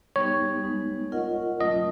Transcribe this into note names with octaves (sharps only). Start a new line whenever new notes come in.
G3 B3 D#4 G4 C#5
G#3 B3 D#4
F4 A#4 D#5 F#5
F#3 A3 C#4 F4 D#5